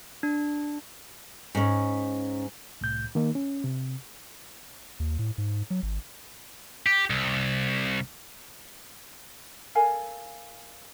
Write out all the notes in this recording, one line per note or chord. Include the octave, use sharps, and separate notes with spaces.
D4
G#2 C#4
C2 A2 G6
D#3 A#3 D#4
C#4
C3
D#2
A2
G#2
F#3
G#1
G4
C2
A4 A#4 F5 G#5